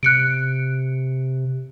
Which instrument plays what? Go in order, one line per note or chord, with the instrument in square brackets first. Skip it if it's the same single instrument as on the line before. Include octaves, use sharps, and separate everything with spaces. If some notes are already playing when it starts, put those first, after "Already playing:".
[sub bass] C3 [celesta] F#6 C#7 D7